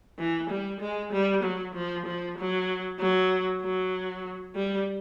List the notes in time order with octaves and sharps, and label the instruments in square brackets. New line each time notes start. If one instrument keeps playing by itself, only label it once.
[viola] E3
G3
G#3
G3
F#3
F3
F3
F#3
F#3
F#3
G3